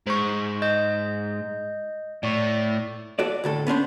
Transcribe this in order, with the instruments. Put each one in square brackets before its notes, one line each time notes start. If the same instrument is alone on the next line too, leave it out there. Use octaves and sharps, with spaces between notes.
[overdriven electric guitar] G#2 [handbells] C5 C#6
[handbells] D#5 G6
[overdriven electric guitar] A2 [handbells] D5 C#6
[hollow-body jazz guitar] F#4 A4 D5
D2 A2 A4
B3 C#4 D4 C5